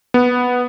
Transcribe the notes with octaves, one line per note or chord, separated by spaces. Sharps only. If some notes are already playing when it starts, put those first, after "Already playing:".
B3